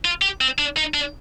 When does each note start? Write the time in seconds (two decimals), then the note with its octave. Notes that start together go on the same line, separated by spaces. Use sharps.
0.05 F4
0.22 G4
0.41 C4
0.59 D4
0.77 D#4
0.94 D4